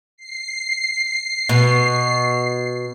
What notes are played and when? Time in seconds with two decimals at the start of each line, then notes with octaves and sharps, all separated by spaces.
0.17 C7
1.49 B2